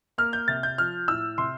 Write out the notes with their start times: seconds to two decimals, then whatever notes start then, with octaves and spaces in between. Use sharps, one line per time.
0.18 A#3 F6
0.33 G6
0.48 C3 A6
0.63 G6
0.78 F3 F6
1.08 A2 E6
1.38 C3 C6